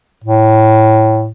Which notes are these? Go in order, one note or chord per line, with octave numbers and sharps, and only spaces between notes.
A2